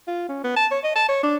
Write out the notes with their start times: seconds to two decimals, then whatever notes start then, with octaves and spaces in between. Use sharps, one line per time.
0.08 F4
0.29 C#4
0.44 B3
0.56 A5
0.71 C#5
0.84 D#5
0.96 A5
1.09 C#5
1.23 D4